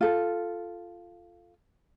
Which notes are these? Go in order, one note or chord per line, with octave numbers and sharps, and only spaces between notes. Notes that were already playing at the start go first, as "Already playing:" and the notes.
F4 A4